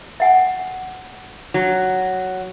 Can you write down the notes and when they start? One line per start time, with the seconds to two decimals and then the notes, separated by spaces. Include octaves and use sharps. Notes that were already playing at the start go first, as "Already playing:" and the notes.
0.20 E5 F#5 G#5
1.54 F#3